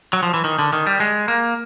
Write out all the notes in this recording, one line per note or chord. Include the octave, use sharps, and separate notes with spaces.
F#3
F3
E3
D#3
D3
D#3
G3
G#3
A#3